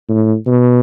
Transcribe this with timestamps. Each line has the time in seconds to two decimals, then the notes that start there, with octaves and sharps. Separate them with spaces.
0.09 A2
0.47 B2